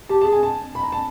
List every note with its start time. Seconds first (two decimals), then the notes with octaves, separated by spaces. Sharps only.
0.09 G4 A5
0.22 A5
0.24 G#4
0.33 G#5
0.43 A5
0.75 B5
0.83 A#5
0.92 A5